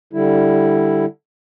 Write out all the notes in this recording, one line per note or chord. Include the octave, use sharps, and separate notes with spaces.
D3 G3 E4